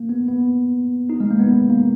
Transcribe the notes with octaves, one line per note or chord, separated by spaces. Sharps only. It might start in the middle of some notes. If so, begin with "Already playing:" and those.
Already playing: A#3
B3
B3
D#4
G#3
A#3
B3
A#3